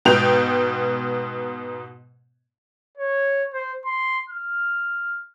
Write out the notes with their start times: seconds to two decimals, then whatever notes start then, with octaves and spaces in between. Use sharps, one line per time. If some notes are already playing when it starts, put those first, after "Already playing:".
0.05 G#2 B2 G5 F7
2.97 C#5
3.54 C5
3.85 C6
4.30 F6